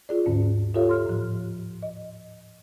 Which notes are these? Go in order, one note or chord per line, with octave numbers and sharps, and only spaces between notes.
F4 G#4 D5
D#2 G#2 D3 C#4
F4 G4 A4 C#5 E5 F5
C6 F6
A2 F3
D#5